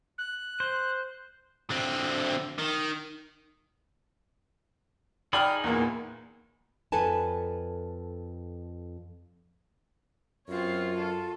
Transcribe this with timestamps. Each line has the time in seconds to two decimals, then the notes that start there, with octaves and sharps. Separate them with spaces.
0.18 F#6
0.60 C5
1.70 D3 C4
2.59 D#3
5.33 D#4 G#4 D5 G5 B5 F6
5.64 E2 A#2 A#3
6.92 F2 A4 B4 G#5 A5
10.48 F#2 B3 C4 F4 C#5 F5
10.96 A4